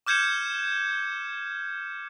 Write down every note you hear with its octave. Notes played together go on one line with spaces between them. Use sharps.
D6 F6 G6 G#6 C#7 E7